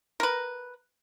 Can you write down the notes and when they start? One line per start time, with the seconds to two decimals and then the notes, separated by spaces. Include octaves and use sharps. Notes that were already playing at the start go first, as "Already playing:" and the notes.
0.20 A#4 B4